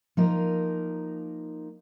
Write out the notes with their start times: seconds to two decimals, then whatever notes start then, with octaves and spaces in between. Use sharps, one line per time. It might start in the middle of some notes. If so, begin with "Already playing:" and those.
0.17 F3 A#3 D#4 A#4